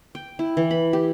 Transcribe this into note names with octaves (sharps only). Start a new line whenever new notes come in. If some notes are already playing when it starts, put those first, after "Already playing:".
G5
E4
E3
B5
G4